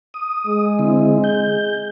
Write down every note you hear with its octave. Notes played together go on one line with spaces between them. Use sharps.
D#6
G#3
D3 C4 E4
G6